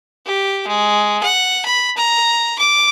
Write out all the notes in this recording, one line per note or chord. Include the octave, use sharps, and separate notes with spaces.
G4
G#3
F#5
B5
A#5
D6